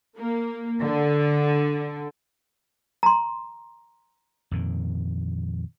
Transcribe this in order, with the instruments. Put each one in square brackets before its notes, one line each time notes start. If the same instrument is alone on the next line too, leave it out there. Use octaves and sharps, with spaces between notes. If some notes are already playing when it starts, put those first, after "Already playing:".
[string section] A#3
D3
[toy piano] A#5 C6
[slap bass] F2 A#2 D#3